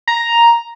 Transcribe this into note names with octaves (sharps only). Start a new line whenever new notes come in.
A#5